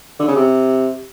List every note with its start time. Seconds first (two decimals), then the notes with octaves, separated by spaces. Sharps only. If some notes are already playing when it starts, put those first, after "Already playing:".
0.19 D3
0.28 C#3
0.36 C3